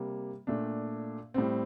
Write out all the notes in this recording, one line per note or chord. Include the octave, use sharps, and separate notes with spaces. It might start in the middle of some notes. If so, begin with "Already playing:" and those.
Already playing: C3 G3 A#3
A#2 A3 D4
A2 G3 C4